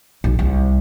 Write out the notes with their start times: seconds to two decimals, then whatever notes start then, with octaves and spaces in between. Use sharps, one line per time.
0.24 B1
0.39 C2